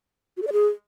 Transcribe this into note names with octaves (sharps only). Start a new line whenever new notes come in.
F#4
A4
D5
G#4